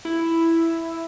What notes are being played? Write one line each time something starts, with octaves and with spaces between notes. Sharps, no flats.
E4